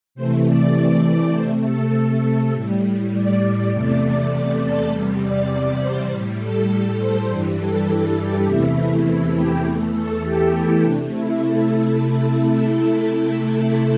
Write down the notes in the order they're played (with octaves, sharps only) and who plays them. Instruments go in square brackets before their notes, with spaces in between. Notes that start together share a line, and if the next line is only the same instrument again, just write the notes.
[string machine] C3 E3 A3 C5
D5
C3 A3 C5
A4
A4
A4
A2 G3
D5
E2 C3 A3 D5
A4
E2 C3 G3
D5
C5
A2 G3
A4
A4
C5
G2 E3 G3 C5
A4
G4
E2 C3 E3 A3 E4
G4
E2 E3 A3
A4
G4
E4
C3 A3 D4
E4
A4